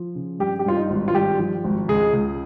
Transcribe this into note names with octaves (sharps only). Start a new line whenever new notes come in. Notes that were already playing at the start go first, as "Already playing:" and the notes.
Already playing: F3
C#3
G2 G4
G4
G2 F4
D#4
G#1
F4
G2 G4
F3
G#1
C#2 G#4
C#2